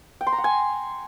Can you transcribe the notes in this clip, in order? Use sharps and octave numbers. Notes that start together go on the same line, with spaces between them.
G5
C6
A#5
F#5
G#5